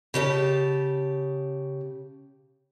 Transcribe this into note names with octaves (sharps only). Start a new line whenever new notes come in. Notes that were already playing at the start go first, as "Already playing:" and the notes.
C#3 G4 D5 A5